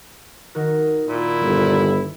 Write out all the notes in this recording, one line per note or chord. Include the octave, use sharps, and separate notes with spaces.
D#3 F#4 A#4
A#2 E4
G1